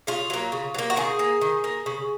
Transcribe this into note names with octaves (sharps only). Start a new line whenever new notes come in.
C#3 F4
F#3 A#3
C#3
F#3
A#3
F#4
D#3 G#4
A#3
D#3
A#3
C#3